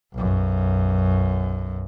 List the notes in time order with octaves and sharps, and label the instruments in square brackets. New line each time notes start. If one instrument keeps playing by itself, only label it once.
[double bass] B1 F#2